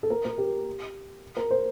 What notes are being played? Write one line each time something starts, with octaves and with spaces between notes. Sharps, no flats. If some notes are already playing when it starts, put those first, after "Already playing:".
A4
A#4
A#4
G4
A#4
C5